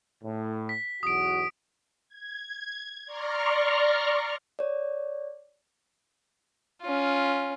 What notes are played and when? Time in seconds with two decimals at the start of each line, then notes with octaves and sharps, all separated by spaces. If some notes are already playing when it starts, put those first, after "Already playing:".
0.23 A2
0.69 B6
1.03 B1 E2 F#4 D#6 D7
2.09 G#6
3.06 D5 A#5 C6 C#6 F6
4.59 C#5 D5
6.82 C#4 F4